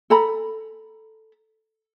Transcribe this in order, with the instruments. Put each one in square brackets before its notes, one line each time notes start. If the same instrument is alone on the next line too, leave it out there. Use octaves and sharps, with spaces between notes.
[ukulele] A4 A#5 B5